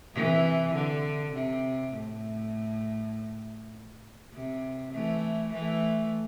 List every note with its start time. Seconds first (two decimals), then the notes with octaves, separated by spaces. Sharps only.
0.14 C3 E3
0.75 D3
1.35 C3
1.93 A2
4.33 C3
4.93 E3 A3
5.53 E3 A3